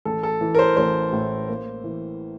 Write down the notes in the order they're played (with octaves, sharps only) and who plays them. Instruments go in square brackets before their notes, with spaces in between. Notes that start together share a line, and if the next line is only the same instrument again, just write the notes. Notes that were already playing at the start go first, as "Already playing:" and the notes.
[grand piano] A1 A4
A4
E3
A#4
C5
A1 C5
A2
A#3
E3